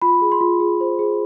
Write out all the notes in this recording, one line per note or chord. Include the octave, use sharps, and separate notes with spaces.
F4 B5
G#4
C6
F4
G#4
C5
G#4